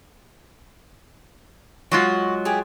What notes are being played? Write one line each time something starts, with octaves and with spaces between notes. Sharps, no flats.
F#3 G#3 F4 F#4
G4 G#4